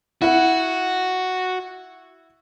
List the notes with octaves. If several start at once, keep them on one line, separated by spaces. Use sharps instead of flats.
E4 F#4 F#5